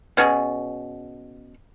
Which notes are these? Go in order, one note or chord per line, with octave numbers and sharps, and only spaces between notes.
B2 C#4 F#4 G#4